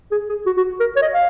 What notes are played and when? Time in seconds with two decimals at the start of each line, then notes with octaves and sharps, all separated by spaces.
0.12 G#4
0.29 G#4
0.46 F#4
0.57 F#4
0.80 A#4
0.96 C#5
1.02 D#5
1.14 F5